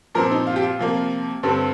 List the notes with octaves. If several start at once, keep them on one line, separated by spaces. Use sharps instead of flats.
A#2 F3 C4 A#4
D#4
F4
G4
F4
C3 F3 A#3
G2 D3 G3 C4